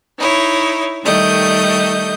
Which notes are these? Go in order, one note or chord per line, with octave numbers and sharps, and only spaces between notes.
D#4 E4 C#5
D#3 G3 A3 D#5 G6